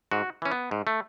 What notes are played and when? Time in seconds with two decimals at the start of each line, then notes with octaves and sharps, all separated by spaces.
0.11 G#2 F#4
0.42 E3 C#4
0.52 B3
0.71 G#2
0.87 A3